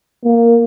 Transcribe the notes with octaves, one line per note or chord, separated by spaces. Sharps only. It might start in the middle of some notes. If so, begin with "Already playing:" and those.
A#3